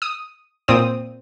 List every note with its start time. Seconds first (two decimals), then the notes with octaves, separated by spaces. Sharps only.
0.02 D#6
0.68 A#2 C4 D#6